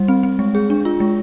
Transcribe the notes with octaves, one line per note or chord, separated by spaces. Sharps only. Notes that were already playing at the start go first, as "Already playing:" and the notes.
Already playing: G3
C4
C4
G#3
G#4
D4
F4
G#3